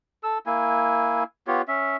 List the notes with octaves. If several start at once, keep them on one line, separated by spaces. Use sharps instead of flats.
A4 E6
A#3 E4 G#5
B3 F4 G4 C#5
C#4 E5